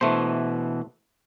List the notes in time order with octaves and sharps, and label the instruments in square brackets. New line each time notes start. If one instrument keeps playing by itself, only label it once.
[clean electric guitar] B2 E3 [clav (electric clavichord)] A3 C5